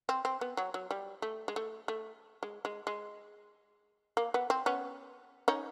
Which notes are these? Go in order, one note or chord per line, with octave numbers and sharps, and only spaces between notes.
C4
C4
B3
F#3
F#3
G3
A3
G#3
A3
A3
G#3
G#3
G#3
A#3
B3
C4
B3 C#4
C#4 D#4